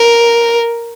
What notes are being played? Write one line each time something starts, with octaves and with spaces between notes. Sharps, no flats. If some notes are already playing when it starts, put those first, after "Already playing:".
Already playing: A#4